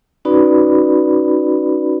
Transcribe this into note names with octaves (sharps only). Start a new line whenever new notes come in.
C#4 D#4 F#4 B4 D5 B5